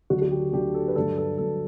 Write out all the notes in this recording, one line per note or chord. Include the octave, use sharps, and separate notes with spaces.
D2 D3 F#3 F#4
F#4
G4
D2 D3 F#3 G4
A4
B4
G2 D3 F#3 A4
A4
G2 D3 F#3 A4